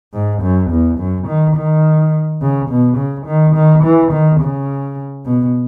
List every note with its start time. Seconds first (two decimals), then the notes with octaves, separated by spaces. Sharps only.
0.14 G#2
0.42 F#2
0.71 E2
0.98 F#2
1.27 D#3
1.56 D#3
2.41 C#3
2.69 B2
2.97 C#3
3.27 D#3
3.55 D#3
3.83 E3
4.12 D#3
4.40 C#3
5.25 B2